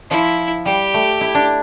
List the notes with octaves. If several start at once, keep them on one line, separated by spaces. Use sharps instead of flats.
F3 E4
G3 G4
A3
E4
D4